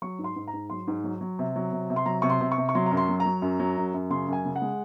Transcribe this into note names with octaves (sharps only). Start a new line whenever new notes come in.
F#3 C#6
G#2
C6
G#2
A#5
G#2
F#3 C6
G#2
F#3
F#3
C3
F#3
C3
C3
C6
F#3 A#5
C3 C#6
C6
C3
C#6
C3
C#6
F#3 C6
A#5
F#2
C6
F#3
A#5
F#3
F#2
F#3
F#2
F#2
C#3 C6
F#2 G#5
C#3
F#5
G#3